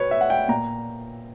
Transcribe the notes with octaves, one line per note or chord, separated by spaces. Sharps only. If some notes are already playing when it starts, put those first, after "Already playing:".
Already playing: B2 B4 C#5
E5
F#5
G5
A#2 A#5